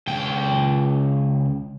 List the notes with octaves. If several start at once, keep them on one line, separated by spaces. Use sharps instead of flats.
C#2 G5